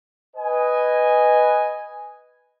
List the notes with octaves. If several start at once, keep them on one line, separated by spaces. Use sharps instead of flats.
B4 D#5 G#5